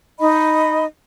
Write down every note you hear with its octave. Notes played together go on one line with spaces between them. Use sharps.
D#4 D#5 B5